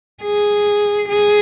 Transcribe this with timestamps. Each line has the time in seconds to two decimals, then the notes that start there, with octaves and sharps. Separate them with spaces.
0.23 G#4
1.09 G#4